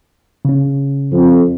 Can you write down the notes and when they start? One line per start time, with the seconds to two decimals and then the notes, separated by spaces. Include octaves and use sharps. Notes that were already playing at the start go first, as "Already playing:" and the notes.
0.45 C#3 C#4
1.12 F2